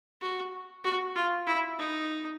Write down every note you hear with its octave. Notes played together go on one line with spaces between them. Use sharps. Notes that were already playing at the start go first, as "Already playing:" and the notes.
F#4
F#4
F4
E4
D#4